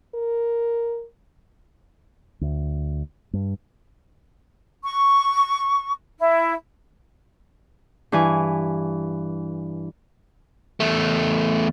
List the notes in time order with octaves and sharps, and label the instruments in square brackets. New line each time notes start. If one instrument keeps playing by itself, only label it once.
[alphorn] A#4
[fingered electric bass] D2
G2
[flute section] C#6
E4
[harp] G2 E3 G#5
[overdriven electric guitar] E2 A3